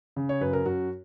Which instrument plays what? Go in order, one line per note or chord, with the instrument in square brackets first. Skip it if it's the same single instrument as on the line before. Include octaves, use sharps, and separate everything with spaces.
[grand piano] C#3
C#5
F#2 B4
A#4
F#2 F#4